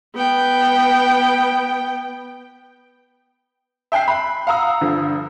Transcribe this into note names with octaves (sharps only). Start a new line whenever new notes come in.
B3 G5
E5 G5 G#5 F#6 C7
B5
F5 F#5 A#5 D#6 E6
G2 D3 F3